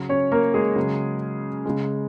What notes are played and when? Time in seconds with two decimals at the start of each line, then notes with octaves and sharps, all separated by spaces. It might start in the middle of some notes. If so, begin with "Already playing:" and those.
Already playing: C#3 F#3
0.09 C#4 C#5
0.32 A#3 A#4
0.54 G#3 G#4
0.76 C#3 F#3
1.66 C#3 G#3